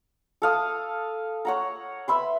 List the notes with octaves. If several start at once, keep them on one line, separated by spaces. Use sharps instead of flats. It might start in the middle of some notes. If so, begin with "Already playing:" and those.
A4 F5 D#6
C#5 F#5 A#5
B4 E5 B5 C6